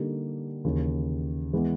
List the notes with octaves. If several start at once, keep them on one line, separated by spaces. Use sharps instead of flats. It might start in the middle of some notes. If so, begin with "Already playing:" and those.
Already playing: D3 G3 A#3 D#4 G4
D#2 C#3 E3
E3 G#3 B3